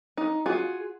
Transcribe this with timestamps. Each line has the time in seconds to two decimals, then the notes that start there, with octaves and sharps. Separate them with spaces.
0.17 D#4
0.46 F4 F#4 G#4